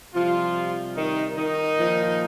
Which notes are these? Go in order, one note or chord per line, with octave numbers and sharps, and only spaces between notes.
C3 F3 G3 F4
D#3 D#4
D#3 D#4
A#2 F3